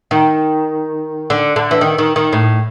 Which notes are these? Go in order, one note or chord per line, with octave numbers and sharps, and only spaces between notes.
D#3
D3
D3
E3
D#3
D#3
D#3
A2